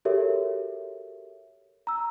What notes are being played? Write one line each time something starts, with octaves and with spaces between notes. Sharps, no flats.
F#4 G4 A4 A#4 C#5 E5
A#5 E6